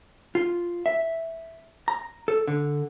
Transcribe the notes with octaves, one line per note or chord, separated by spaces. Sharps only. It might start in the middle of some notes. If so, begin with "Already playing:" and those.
F4
E5
A#5
A4
D3